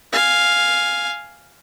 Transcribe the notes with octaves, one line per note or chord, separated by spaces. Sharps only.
F5 G#5